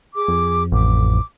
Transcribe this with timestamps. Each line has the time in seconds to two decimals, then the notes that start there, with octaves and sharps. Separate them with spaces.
0.14 G#4 D6
0.28 F2
0.72 A1 D6